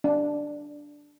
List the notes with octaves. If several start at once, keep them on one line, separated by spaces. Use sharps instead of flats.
D4